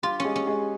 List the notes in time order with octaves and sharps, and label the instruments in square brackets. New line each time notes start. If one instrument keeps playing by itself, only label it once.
[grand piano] G3 G4 [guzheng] F4
[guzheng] C#4
[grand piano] G#3 G#4
[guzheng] C#4
[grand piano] G#3 G#4